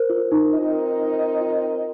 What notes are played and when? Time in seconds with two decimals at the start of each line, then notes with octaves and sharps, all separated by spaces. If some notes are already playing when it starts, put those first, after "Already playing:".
Already playing: A#4 C5
0.10 F4
0.32 D#4
0.54 C4 D#4 F4 A#4 D#5
1.41 F4